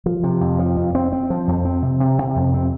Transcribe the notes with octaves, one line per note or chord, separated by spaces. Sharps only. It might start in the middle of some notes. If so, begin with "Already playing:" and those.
F3
C3
F2
F3
F2
C4
C4
F3
F2
C4
C3
C3
C3
F2
C4